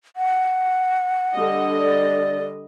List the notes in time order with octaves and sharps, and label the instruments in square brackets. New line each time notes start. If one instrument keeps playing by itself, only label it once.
[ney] F#5
[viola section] D3 G3 D#5
[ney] D5